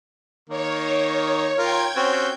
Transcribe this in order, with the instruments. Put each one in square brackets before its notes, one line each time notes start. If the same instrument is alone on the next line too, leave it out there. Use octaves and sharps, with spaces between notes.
[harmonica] D#3 A#3 [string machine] C#5
[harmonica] F4 A#4 [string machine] G5 G#6
[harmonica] C4 C#4 F#4 [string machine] G6